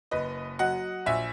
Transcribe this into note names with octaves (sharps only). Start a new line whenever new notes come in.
F#1 B4 D#5
F#3 D#5 F#5
A#1 E5 G#5